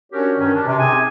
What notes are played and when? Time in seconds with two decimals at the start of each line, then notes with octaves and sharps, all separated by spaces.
0.12 C#4 D4 F#4 G4 A#4 C#5
0.38 G2 D#3 C#4
0.54 D4
0.66 C3
0.79 C4 D#4 G4 G#4 G#5